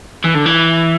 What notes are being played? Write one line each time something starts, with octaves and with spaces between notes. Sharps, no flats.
E3
D3
E3